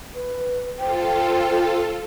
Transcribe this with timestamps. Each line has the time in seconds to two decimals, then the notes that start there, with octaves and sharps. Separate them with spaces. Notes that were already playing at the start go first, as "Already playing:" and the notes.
0.15 B4
0.79 F4 A4 C5 G5